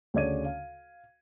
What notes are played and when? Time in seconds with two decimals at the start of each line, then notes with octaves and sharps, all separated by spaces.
0.14 D2 C#3 C#5 D5 G#6 D#7
0.45 F5